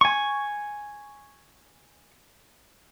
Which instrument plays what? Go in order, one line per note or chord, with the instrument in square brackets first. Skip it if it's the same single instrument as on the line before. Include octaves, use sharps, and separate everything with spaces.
[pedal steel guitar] G#5 C#6